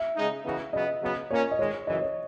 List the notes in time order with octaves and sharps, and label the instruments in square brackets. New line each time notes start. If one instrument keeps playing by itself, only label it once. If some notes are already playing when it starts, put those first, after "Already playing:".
Already playing: [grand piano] E5
[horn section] C#3 G#3 D#4
C#3 E3 B3 D#4 F#4
[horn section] C#3 F#3 B3 [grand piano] D#5
[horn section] C#3 F#3 B3
[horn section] A#2 A#3 C#4 [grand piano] C#5
[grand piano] D#5
[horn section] G#2 D#3 G#3 [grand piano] C#5
[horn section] F#2 C#3 E3 [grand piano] D#5
[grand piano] C#5